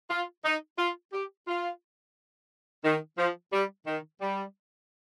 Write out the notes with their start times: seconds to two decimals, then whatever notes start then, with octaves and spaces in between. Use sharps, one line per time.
0.11 F4
0.45 D#4
0.79 F4
1.13 G4
1.48 F4
2.84 D#3
3.18 F3
3.53 G3
3.87 D#3
4.22 G3